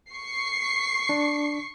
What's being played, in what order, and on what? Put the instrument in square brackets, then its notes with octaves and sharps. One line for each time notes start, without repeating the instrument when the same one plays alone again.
[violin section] C#6 C7
[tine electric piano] D4